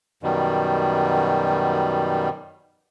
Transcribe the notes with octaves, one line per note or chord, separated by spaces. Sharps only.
F#2 B2 D#3 G3